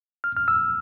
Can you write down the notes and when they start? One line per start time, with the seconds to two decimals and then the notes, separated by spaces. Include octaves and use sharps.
0.24 F6
0.37 F6
0.48 E6